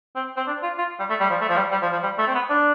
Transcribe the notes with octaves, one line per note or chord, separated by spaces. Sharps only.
C4
C4
D4
F4
F4
G3
A3
G3
F3
A3
F3
G3
G3
F3
F3
G3
A3
C4
B3
D4